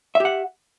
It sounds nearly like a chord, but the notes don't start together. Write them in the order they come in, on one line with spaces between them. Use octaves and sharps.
E5 G4 F#5